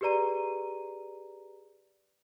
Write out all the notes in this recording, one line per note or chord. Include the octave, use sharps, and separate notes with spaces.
G4 G#4 B4 D5 A#5 D#7